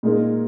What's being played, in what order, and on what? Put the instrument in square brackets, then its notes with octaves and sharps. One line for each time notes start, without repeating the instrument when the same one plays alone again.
[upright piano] A#2 G#3 D#4 A#4